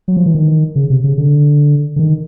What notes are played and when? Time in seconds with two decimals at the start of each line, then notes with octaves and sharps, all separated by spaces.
0.08 F#3
0.17 F3
0.26 E3
0.35 D#3
0.76 C#3
0.90 C3
1.04 C#3
1.18 D3
1.96 D3
1.99 D#3